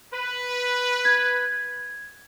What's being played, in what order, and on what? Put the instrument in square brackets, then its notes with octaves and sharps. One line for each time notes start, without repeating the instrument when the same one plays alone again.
[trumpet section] B4
[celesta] G#6